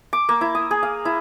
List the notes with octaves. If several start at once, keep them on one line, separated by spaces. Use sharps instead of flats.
D6
A#3
E4
D#6
G#4
F5
E4